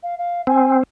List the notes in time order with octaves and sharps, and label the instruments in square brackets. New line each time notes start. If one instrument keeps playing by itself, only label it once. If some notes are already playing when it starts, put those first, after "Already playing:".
[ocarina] F5
F5
[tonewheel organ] C4 [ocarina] G#5